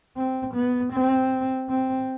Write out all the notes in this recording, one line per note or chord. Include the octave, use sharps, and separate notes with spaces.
C4
B3
C4
C4